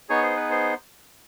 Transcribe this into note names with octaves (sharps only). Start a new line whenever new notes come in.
B3 D#4 G#4 C#5
C5
B4
C5